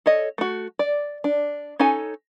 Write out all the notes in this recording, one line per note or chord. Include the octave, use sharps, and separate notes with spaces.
A4 C#5 D#5
A3 F#4
D5
D4
C#4 D#4 A4 G#5